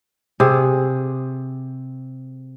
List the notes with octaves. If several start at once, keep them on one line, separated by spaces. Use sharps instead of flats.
C3 G#4